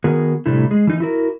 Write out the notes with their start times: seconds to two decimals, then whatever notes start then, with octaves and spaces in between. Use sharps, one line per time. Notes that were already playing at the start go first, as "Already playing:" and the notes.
0.04 D#3 B3 F#4 G#4 A#4
0.46 A2 C3 G3 A3 D4 E4
0.71 G#3 G#4
0.87 E3 D#4
1.00 E4 F#4 A#4